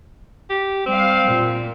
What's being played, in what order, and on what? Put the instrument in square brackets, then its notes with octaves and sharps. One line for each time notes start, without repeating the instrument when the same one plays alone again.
[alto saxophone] G4
[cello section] G3 F5 [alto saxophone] C4
[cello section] A#2